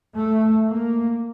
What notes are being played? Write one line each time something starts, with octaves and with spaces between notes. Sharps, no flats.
A3
A#3